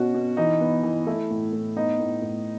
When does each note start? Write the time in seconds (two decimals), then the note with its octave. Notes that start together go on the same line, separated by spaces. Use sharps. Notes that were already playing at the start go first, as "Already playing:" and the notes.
Already playing: B2 C#4 F#4
0.14 B2
0.37 E3 D#4
0.61 B3
0.83 E3
1.07 A3 E4
1.31 A2
1.53 A2
1.76 B3 D#4
1.99 A2
2.22 A2